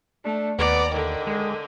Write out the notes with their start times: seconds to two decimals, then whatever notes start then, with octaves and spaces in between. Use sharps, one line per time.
0.25 A3 D4
0.59 D#2 B3 D5 A#5
0.92 D3 D#3
1.27 G#3